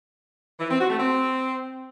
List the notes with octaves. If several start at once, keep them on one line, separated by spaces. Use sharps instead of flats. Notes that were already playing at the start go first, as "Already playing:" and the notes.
E3
C4
F#4
A3
C4